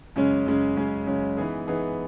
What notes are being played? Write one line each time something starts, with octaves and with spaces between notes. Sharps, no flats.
F#2 C#3 G#3 C#4
F#2 C#3 G#3 C#4
F#2 C#3 G#3 C#4
F#2 C#3 G#3 C#4
E3 B3 D#4 G#4
E3 B3 D#4 G#4